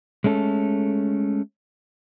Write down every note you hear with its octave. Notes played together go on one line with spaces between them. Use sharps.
G#3 A3 C#4 A4